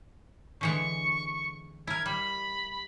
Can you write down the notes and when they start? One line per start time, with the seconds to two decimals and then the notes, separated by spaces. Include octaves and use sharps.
0.61 D3 E3 G#3 C#6
1.87 E4 A#4 G#6
2.06 G3 B5